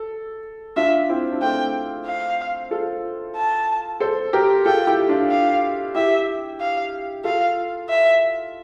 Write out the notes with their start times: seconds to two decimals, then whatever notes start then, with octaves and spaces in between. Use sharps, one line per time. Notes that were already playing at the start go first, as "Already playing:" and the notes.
Already playing: A4
0.76 D4 F4 E5
1.09 C4 E4
1.32 D4
1.42 A3 C4 G5
2.06 F5
2.71 F4 A4
3.36 A5
4.00 A4 C5
4.33 G4 A#4
4.65 F4 A4 G5
4.87 E4 G4
5.09 D4 F4
5.31 F5
5.95 E4 G4 E5
6.61 F5
7.24 F4 A4 F5
7.90 E5